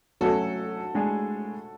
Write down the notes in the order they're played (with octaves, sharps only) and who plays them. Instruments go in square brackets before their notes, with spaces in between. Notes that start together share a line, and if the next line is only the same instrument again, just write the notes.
[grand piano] F#3 A3 C#4 [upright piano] F#4 A4
[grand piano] A2 G#3 D4 G#4